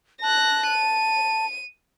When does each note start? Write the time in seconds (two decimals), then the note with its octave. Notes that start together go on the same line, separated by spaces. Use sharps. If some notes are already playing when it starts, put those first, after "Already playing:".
0.22 A5 F#6 A#6
0.67 D#7